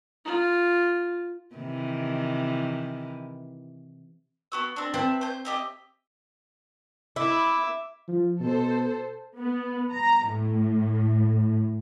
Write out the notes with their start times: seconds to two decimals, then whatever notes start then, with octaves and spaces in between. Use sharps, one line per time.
0.25 F4
1.55 C3 D#3 E3
4.52 B3 F#4 E6
4.76 C4 D4
4.94 C4 B4 E5 A5
5.21 C5 G6
5.45 G4 D#5 E5
7.16 E4 E5 D6
8.08 F3
8.41 B2 A4 C5
9.38 B3
9.92 A#5
10.26 A2